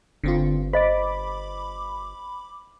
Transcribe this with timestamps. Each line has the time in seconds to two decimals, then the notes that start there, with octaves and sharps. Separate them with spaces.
0.24 G1 D3 C4 F4
0.73 C5 D#5 B5 D6